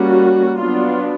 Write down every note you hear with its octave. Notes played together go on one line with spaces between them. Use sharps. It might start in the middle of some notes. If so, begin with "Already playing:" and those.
Already playing: G3 A#3 C#4 F#4
F#3 B3 D4 F4